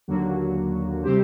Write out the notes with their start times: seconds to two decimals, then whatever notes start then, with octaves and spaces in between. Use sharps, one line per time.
0.08 D#2 D3 F#3 A#3 F#4
1.03 C3 G3 C4 G4 C5